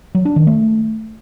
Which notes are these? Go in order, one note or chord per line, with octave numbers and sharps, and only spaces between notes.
F#3
D4
D#3
A3